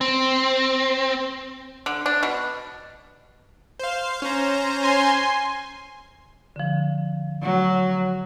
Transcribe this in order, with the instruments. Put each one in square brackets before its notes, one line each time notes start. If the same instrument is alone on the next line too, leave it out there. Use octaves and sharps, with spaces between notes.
[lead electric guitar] C4
[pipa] D3
D4
B2
[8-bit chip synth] C5 F5
C#4 C5 A#5
[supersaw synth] G#5 C6
[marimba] D3 F3
[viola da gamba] F#3